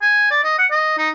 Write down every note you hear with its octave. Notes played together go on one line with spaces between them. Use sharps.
G#5
D5
D#5
F#5
D#5
D#4